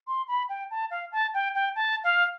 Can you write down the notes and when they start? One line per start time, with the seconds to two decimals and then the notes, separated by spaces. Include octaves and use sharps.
0.07 C6
0.28 B5
0.49 G5
0.71 A5
0.91 F5
1.12 A5
1.34 G5
1.55 G5
1.76 A5
2.04 F5